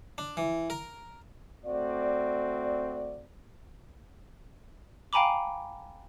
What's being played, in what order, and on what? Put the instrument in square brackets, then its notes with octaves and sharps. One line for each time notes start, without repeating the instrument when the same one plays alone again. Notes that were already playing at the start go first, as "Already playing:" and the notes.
[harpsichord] D4
E3
A#4
[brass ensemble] A3 C4 F#4 D5
[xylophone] F5 G5 G#5 A#5 B5 D6